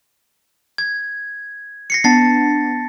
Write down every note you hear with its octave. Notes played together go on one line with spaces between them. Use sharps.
G#6
A#6 C7 C#7
B3 D4 A5 A6 C7